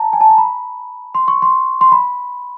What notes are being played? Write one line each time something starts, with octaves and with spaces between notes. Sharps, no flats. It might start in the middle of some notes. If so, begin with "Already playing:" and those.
Already playing: A5 A#5
G#5
A5
A#5
B5
C6
C#6
C6
C6
B5